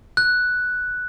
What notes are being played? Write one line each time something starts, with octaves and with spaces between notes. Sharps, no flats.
F#6